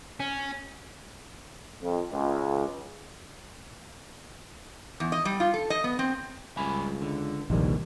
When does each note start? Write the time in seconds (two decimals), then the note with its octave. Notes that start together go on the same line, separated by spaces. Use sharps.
0.20 C#4
1.82 F2
2.12 C#2
5.00 E2
5.12 D#5
5.25 G3
5.40 F4
5.54 A4
5.70 D#5
5.84 B3
5.99 C4
6.57 C#2 G2 G#5 B5
7.02 D3
7.50 A#1 D#2 C3 D#3 E3 G3